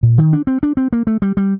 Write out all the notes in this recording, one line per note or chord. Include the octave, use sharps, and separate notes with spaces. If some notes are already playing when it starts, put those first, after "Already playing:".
A#2
D#3
D4
C4
D4
C4
A#3
A3
G3
G3